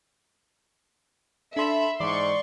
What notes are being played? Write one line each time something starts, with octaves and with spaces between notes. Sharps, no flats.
D4 A4 E5 B5 C6
G#2 E3 D5 C6 C#6